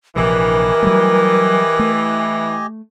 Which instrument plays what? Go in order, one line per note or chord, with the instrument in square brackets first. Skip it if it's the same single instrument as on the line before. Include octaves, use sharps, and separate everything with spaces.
[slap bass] A#1 C3 F3 [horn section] E3 [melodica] G4 D#5 G#5 [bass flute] A#4
[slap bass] F#3 G3 A3
A3